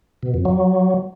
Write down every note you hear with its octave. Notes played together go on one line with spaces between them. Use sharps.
B2
F2
F#3